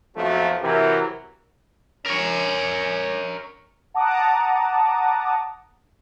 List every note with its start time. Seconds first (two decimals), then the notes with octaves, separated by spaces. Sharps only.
0.16 B1 F2 F3 F#3 A3
0.62 C3 E3 F#3 G4 A#4
2.06 C#4 A#4 C#5
3.94 F#5 A5 A#5 D6 D#6